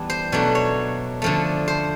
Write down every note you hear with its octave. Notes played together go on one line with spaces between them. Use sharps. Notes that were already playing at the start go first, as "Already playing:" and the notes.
Already playing: E3 G3 B3 D4
C5
B2 F#3 A3 D4
C#5
D3 F3 A3
C5